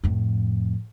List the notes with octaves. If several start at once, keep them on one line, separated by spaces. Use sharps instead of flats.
F2 A2